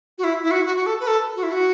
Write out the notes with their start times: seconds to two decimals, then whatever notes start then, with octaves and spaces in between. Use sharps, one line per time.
0.18 F#4
0.24 E4
0.43 E4
0.51 F#4
0.65 F#4
0.76 F#4
0.86 A4
1.00 B4
1.07 A4
1.36 F#4
1.43 E4
1.52 F#4